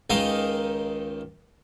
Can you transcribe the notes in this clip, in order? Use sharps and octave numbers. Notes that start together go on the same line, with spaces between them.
C#2 D#3 D#4 D#5 F5 G5